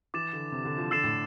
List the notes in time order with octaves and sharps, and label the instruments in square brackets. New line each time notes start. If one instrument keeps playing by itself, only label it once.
[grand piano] E3 [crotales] D6 A6 E7
[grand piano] D3
C3
D3
F3
[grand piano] D3 [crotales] E6 A6 C7 E7
[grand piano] A2